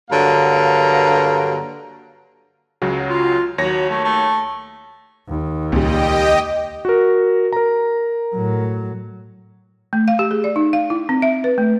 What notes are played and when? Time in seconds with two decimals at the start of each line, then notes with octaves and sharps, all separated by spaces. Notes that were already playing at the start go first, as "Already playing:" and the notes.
0.11 G2 D3 F#3 A#3 F5 A#5
2.82 C#2 C#3 F#3
3.08 F4
3.58 D#2 F#3 C#5 A#6
3.90 A3
4.04 A3
5.28 D#2
5.72 C#2 A#2 G3 G4 D#5 G5
6.85 F#4 A#4
7.52 A#4 A#5
8.34 A2 F#3
9.93 A3
10.08 F5
10.19 G4
10.31 G#4
10.44 D5
10.56 D#4
10.73 F5
10.90 E4
11.09 C4
11.22 E5
11.44 B4
11.58 A3